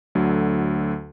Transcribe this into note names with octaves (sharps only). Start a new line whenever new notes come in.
D2 D3 F#3